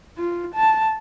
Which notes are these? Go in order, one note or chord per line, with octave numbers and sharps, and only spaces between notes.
F4
A5